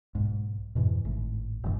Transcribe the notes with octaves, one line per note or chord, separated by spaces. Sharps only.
B1 G#2
F2 G#2 B2 E3
G#1 A2
F1 A#1 G2 E3